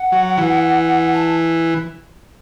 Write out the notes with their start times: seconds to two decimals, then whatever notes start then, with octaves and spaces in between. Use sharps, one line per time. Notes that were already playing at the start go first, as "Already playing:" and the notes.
Already playing: F#5
0.12 F#3
0.38 E3
1.13 A5